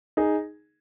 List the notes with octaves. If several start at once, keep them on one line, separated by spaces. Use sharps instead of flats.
D#4 G#4